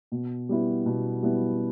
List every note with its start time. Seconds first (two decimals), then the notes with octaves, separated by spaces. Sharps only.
0.12 B2
0.49 G3 B3 E4
0.86 B2
1.23 G3 B3 E4